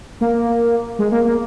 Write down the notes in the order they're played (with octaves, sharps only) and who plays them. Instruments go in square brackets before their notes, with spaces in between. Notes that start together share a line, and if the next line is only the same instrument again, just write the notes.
[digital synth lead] A#3
G#3
A#3
A#3